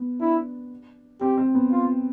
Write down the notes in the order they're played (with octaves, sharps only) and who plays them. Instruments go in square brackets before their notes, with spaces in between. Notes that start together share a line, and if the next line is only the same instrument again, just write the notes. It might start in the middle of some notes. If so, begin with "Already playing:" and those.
Already playing: [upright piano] B3
[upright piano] D4 [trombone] E4
[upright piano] C4 [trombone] G4
[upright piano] C4
B3
[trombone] F4